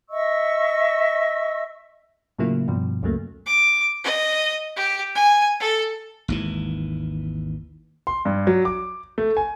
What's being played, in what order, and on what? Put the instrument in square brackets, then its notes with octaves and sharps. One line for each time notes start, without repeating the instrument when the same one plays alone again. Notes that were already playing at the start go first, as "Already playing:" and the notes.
[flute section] D#5 E5 C#6 E6
[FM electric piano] A2 C#3 F#3 A#3 E4 F4
G2 B2 F3
C#2 F#2 C#3 F#3 A3 A#3
[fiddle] D6
D#5
G4
G#5
A4
[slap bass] G#1 D#2 E3
[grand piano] C6
G2
F#3
D6
A3
G#5